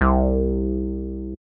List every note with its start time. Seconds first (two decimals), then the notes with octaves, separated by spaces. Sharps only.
0.01 C2